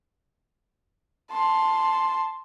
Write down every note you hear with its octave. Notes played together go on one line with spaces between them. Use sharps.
A5 C6